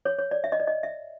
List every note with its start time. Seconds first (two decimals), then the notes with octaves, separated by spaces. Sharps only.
0.05 C#5
0.18 C#5
0.31 D5
0.44 E5
0.52 D#5
0.60 D5
0.67 D#5
0.83 E5